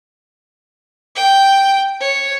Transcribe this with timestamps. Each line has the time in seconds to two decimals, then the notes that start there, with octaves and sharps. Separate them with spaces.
1.16 G5
2.01 C#5